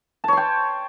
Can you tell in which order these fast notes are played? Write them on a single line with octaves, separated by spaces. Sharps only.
A5 C#5 C6 G5